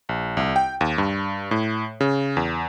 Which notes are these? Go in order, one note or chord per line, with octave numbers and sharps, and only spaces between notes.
A#1
C2
G5
D#2
G2
A2
C#3
E2